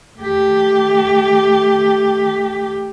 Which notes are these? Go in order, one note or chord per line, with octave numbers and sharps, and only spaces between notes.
A3 G4